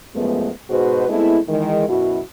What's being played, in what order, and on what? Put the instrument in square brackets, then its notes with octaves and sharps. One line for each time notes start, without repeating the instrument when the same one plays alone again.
[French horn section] F#2 F3 G#3 A3 B3
G#2 B2 F#4 G#4 B4 C5
G#3 A3 B3 C4 E4
D#3 E3 G#3
F#2 B2 E4 F#4